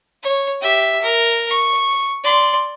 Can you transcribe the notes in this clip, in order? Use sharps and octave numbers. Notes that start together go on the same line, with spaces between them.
C#5
G4 E5
A#4
C#6
D5 C6